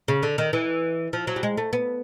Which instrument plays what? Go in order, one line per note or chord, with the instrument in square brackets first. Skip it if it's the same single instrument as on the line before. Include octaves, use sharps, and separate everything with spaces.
[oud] C#3
D3
D#3
E3
F3
F#3
G3
G#3
A3
B3